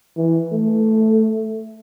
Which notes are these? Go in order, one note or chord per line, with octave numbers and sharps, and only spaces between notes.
E3
A3